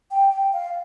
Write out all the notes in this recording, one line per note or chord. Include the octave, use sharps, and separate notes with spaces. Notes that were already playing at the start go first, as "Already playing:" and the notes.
G5
G5
F5